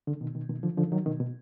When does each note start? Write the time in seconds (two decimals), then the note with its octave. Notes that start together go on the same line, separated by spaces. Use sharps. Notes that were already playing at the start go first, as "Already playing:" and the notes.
0.07 D3
0.21 B2 D#3
0.35 B2 D#3
0.49 B2 D#3
0.63 D3 F3
0.77 D3 F3
0.92 D#3 F#3
1.06 B2 D#3
1.20 B2